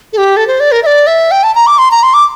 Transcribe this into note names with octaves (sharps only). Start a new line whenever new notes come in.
A4
G4
A4
C5
D5
A#4
E5
D5
E5
G5
A5
A#5
D6
C6
A#5
C6
D6